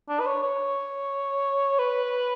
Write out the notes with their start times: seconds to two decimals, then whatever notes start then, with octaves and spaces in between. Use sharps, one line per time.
0.09 D4
0.20 B4
0.27 C#5
0.43 C#5
1.79 B4